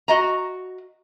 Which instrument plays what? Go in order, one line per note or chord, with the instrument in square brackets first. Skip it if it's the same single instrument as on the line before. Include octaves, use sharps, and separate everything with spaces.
[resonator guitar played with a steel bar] F#4 D#5 A#5